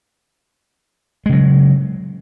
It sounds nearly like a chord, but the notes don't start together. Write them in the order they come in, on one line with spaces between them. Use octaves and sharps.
G#3 C#3 F#3